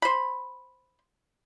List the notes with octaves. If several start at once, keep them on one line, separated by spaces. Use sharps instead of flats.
C5 B5